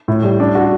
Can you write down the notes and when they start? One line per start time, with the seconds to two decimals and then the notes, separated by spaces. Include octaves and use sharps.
0.08 A2
0.23 G3
0.40 D4
0.55 F#4